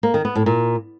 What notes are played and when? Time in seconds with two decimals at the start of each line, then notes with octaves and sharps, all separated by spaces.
0.03 A#3
0.14 D#3
0.25 B3
0.35 A2
0.46 A#2